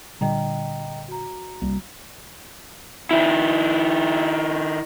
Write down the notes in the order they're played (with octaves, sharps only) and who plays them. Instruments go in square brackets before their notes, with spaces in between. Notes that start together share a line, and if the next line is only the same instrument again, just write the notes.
[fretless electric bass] A#2 D3 G3 [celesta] D#5 G5 A#5
[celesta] F#4 A#5
[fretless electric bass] C2 G3 A#3
[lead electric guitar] D#3 E4